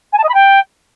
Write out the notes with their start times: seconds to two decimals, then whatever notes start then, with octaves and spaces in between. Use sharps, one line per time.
0.12 G#5
0.18 A5
0.23 D#5
0.28 B5
0.34 G5